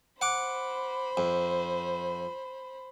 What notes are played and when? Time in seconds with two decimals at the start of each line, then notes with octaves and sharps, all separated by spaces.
0.21 C5 F#5 B5 D6
1.17 F2